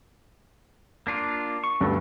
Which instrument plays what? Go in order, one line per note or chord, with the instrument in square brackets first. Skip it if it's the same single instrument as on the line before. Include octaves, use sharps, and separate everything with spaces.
[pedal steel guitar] A#3 D4 F4
C#6
[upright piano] D2 G2 A4